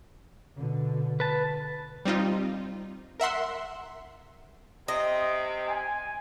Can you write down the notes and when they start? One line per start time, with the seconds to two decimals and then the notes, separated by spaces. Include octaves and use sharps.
0.56 B2 D3
1.20 B4 A5
2.05 G3 C4 D#4 F4
3.20 A#4 E5 F#5 C6
4.88 C3 D#5
5.68 G#5